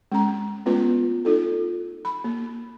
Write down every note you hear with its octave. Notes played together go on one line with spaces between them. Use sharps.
G#3 C#4 A#5
G#3 A3 B3 C#4 F4 B4
D#4 F4 A4
B5
A#3